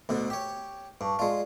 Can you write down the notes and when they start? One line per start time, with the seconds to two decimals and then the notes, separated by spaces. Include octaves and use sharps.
0.09 D2 B2 D3
0.30 G4 C#5
1.01 G2 B4 A5 C#6
1.19 G#3 F4 D5